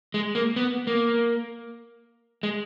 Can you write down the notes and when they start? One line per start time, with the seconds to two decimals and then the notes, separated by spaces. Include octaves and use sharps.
0.14 G#3
0.35 A#3
0.56 B3
0.87 A#3
2.43 G#3